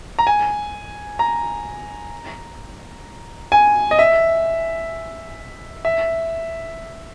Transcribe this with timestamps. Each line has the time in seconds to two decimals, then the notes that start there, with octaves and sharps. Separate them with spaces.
0.19 A#5
0.27 G#5
1.19 A#5
3.52 G#5
3.91 D#5
3.99 E5
5.85 E5